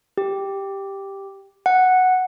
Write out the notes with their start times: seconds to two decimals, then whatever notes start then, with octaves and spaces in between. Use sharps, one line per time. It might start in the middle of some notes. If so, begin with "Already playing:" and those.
0.17 G4
1.66 F#5